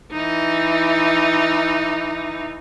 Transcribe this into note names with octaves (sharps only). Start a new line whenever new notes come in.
E3 D#4